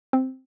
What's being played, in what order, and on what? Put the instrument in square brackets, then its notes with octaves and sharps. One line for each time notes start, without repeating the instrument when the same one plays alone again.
[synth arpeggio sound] C4